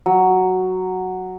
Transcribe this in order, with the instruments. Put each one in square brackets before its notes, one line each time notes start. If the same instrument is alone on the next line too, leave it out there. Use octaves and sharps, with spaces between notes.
[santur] F#3